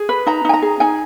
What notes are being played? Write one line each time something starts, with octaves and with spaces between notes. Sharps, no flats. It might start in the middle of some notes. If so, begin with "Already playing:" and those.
Already playing: G#4
B4
D#4 A#5
D#4 G#5
A#5
G#4
D#4 G#5